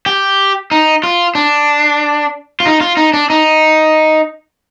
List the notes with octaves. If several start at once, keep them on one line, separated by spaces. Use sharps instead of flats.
G4
D#4
F4
D4
F4
D#4
F4
D#4
D4
D#4